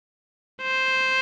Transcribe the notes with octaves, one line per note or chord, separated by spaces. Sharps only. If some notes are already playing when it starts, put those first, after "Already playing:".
C5